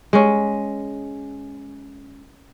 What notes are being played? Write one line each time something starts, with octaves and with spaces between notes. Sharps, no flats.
G#3 C#4